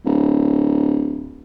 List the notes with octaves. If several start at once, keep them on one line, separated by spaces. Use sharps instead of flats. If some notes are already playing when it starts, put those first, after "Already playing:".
D1